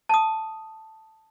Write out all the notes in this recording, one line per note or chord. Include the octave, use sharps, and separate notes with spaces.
A5 D#6